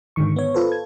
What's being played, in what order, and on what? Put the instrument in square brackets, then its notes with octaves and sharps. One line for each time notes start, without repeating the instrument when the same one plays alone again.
[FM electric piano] G#2 D3 D#3 C#6
B3 C#5
F4 A4 B4 C5
G#6